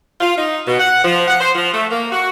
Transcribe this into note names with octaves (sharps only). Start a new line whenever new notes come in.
F4
D#4
B2
F#5
F3
F#5
C5
F3
A3
A#3
F#4